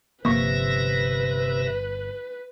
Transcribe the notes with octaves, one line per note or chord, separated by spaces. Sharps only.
G1 C3 F3 A#3 B4 E5 C#6 A#6